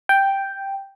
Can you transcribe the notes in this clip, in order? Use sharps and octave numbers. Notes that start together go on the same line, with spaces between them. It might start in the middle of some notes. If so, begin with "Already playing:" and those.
G5